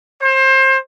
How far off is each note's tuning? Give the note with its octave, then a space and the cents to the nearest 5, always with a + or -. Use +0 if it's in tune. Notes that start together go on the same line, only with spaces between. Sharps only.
C5 +25